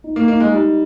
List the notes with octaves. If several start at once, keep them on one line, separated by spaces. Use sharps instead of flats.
D#4
A#3
A#3 D#4
G#3
G3 D#4